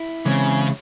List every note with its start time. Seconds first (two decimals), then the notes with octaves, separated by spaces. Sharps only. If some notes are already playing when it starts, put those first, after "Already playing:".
Already playing: E4
0.25 C#3 E3 G#3 C4 E4